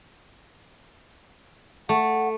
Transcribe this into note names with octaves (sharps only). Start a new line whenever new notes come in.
A3 F#5